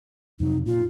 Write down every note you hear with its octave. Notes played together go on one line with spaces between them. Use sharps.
F2 C3 F#3 D#4
A#2 F4